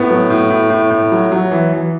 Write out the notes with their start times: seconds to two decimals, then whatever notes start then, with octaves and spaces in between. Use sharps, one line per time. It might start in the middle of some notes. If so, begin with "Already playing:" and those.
Already playing: A2 B3
0.10 F#3
0.30 A2
0.50 A2
0.70 A2
0.90 A2
1.12 F#3
1.32 F#3
1.51 E3
1.73 E3